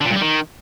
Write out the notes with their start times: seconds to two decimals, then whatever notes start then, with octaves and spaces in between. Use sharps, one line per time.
0.01 D3
0.06 A#2
0.11 G2
0.16 G3
0.22 D#3